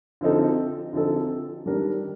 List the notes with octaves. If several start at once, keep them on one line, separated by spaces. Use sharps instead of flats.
D3 F3 C4 D#4 A4
D3 F3 C4 D#4 A4
D#3 G3 D4 G4 A#4